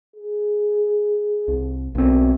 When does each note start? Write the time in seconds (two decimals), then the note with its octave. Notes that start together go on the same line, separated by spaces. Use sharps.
0.16 G#4
1.48 C2
1.95 B1 F#2 C4